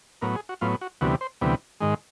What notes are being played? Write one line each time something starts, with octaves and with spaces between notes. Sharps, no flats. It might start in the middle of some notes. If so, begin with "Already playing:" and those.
A2 F#3 B3 A#4
G#4
F#4
A2 F#3 B3 F4
F#4
D2 C3 E3 G3 B3 F#4
C5
D2 C3 E3 G3 B3
G#2 D#3 G#3